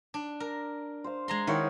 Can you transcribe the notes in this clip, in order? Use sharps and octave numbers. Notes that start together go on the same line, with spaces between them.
D4
A#4
C5 F5
G#3 A#5 C6
D#3 E4 C#5 F5 F#5